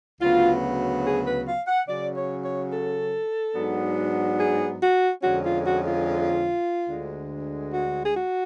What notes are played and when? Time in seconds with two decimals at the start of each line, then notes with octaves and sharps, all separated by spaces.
0.21 D2 C#3 F#3 B3 F4
1.04 G#4
1.25 B4
1.47 F5
1.67 F#5
1.88 C#3 F#3 C#4 D5
2.16 C#5
2.44 C#5
2.72 A4
3.55 G#2 F#3 B3 D4
4.39 G#4
4.80 F#4
5.22 F2 D3 G#3 C#4 F#4
5.43 F4
5.64 F#4
5.86 F4
6.89 D2 D3 G#3
7.73 F#4
8.04 G#4
8.15 F#4